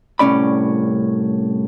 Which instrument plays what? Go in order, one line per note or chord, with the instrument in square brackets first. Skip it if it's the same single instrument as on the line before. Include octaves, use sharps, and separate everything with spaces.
[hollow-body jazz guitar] C2 A2 C#4 D5 B5